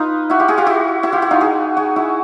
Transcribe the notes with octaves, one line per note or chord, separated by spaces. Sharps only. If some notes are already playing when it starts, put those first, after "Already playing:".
Already playing: D#4 F4 B4
E4 F#4
F4 G4
F#4 G#4
F4 G4
E4 F#4
E4 F#4
F4 G4
E4 F#4
D#4 F4
F#4 G#4
F#4 G#4
E4 F#4